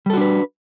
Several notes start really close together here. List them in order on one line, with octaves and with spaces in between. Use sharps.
G3 A4 F#4 D4 B4